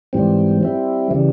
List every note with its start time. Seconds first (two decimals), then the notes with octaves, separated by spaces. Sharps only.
0.13 G#2 E3 G3 C4
0.61 G3 C4 E4
1.11 C#3 E3 G3